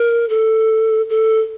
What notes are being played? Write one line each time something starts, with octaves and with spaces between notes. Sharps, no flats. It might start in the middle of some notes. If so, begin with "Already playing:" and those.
Already playing: A#4
A4
A4